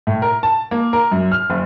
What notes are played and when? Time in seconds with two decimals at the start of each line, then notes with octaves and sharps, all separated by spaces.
0.07 A2
0.22 A#4
0.43 A5
0.71 A#3
0.93 A#4
1.11 F#2
1.32 F6
1.50 F#1